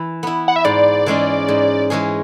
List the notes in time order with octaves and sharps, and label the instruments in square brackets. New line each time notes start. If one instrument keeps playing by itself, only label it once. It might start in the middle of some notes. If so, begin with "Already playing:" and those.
Already playing: [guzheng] E3 E4
B3 E4
[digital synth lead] F#5
E5
[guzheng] G#2 [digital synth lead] D5
[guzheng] E3 G#3 C#4 G#4
G#2
E3 G#3 C#4 G#4